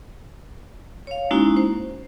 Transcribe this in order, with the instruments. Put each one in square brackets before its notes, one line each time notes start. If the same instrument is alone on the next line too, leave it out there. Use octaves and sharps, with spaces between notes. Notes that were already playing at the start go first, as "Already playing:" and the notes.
[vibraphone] C#5 F5
G#3 A#3 C#4 D#4 E4 F#4
C5